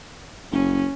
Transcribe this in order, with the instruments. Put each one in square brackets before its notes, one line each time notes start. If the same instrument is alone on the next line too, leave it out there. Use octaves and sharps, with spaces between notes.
[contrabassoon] F#1 [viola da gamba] C#4